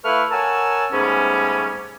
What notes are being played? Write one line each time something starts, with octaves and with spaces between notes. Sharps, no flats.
A3 E4 B4 F5 C#6 F6
A#4 C#5 F#5 G#5 A5 E6
G#2 G3 A3 B3 C#4